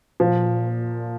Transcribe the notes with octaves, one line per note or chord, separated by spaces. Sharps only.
A#2 F3